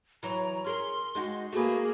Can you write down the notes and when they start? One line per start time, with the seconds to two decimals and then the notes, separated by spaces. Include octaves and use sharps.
0.23 E3 F#3 C#5 A#5
0.64 C#4 G#4 A#4 C6
1.15 G#3 D#4 F#4
1.53 A3 A#3 F#4 G#4 B4